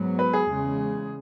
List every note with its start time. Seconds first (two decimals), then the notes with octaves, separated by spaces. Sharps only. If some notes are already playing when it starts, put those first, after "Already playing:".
Already playing: G#2 F#3 B3
0.19 B4
0.33 G#4
0.48 E2 C#3 G#3